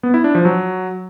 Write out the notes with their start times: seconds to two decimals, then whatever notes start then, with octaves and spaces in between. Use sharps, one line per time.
0.03 B3
0.14 E4
0.24 D4
0.35 F3
0.45 F#3